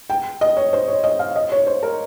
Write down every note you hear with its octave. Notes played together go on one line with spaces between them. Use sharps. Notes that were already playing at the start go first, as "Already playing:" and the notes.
G5
D#5
C#5
C5
C#5
D#5
F5
D#5
C#5
C5
A#4